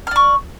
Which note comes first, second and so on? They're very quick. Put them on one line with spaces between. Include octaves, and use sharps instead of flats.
F6 D5 C#6